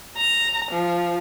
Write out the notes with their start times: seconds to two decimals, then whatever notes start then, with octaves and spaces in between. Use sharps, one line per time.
0.17 A#5
0.72 F3